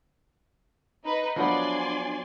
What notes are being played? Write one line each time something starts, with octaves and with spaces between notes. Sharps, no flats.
D#4 B4
F3 F#3 B3 D4 D5 G#5 C6